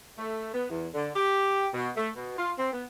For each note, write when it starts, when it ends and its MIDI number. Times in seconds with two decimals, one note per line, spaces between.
0.18 0.50 57
0.54 0.66 59
0.70 0.89 40
0.94 1.10 50
1.16 1.68 67
1.74 1.90 47
1.96 2.10 57
2.17 2.36 47
2.38 2.52 65
2.59 2.71 60
2.73 2.84 59